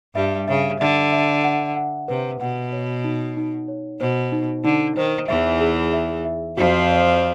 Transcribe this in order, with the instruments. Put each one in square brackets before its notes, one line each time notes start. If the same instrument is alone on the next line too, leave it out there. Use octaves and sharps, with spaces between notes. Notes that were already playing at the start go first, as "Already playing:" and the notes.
[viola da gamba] G2 G3 [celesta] E5
[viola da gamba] C#3 [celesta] E5
[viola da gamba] D3 [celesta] E5
[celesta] E5
F#5
F#5
[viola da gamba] C3 [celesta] B4
[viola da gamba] B2 [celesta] F#5
[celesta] C#5
D#4
D#4
C#5
[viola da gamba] B2 [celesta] C5
[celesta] D#4
[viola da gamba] D3 [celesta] D#4
[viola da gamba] D#3 [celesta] C5
[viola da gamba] E2 E3 [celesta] E5
[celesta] G#4
E5
E5
[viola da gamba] F2 F3 [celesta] F#4
[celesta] D5